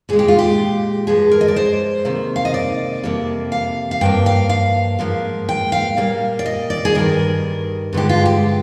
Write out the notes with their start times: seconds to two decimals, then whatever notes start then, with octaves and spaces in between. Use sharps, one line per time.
0.09 A#2 G#3 G#4
0.19 G4
0.28 F4
0.39 G4
1.07 G2 F3 G#3 G#4
1.31 A#4
1.41 D#5
1.48 D5
1.56 C5
2.05 C3 D#3 A#3
2.36 F5
2.45 D#5
2.54 D5
3.03 F2 C3 G3 A#3
3.52 F5
3.91 F5
4.01 G2 F3 A#3 G5
4.26 F5
4.49 F5
4.99 G#2 F3 A#3
5.49 G5
5.72 F5
5.97 A#2 G3 A#3
6.39 D5
6.46 D#5
6.70 D5
6.85 G#4
6.95 G2 D#3 G3 A#4
7.93 G2 D3 F3 G#3 G4
8.09 F4
8.26 G4